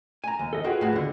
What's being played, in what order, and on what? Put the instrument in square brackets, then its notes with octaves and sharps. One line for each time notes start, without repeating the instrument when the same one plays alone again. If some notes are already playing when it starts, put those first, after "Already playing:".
[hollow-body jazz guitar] G#5 A#5
D#2
[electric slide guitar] A4 D#5
[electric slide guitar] F4 G#4 B4 [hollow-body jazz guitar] F#4 G5
[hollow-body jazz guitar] A2 F#4
D#2 D3